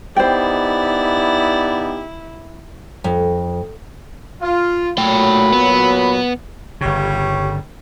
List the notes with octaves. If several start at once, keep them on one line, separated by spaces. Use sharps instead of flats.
B3 D#4 E4 G4 C5 D5 G5
F2
F4
A#2 F#3 A3 G5 B5
B3
G1 C#3 G3 C#5